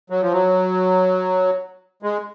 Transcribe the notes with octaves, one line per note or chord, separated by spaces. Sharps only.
F#3
F3
F#3
G#3